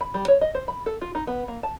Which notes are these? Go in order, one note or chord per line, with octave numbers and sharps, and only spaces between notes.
B5
G3
C#5
D#5
C5
B5
A4
F4
D#4
B3
A#3
A5